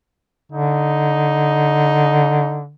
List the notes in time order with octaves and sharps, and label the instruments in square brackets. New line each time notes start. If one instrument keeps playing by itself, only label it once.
[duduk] D3 [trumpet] D#4